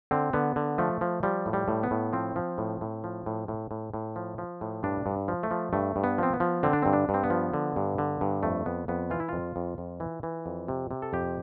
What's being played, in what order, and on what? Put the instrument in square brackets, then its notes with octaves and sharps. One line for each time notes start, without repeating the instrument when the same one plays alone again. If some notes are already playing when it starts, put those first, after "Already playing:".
[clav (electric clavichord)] D3 C4
D3 B3
D3
F3 A3
F3
F3 G3
A2
G3
A2
B3
A2
F3 C4
F3
A2
A2
F3
A2
A2
A2
A2
F3
F3
A2
G2 D4
G2
F3
A3
F3
G2 A3
G2
B3
F3 C4
B3
F3
D3 C4
D4
G2 C4
D4
G2
C4
B3
F3
D3
G2
D3
G2
F2 A3
F2 B3
F2 B3
E3 F4
E4
F2 F4
F2
F2
E3
E3
F2
C3
C3
A4
F2 G4